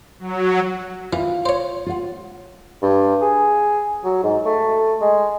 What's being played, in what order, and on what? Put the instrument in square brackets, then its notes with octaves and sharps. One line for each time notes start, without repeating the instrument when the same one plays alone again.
[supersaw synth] F#3
[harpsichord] E3 [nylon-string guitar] F4
[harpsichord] C5 C#5
[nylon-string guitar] F4 F#5
[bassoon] G2
G#4
F#3
G#2
A3
G#3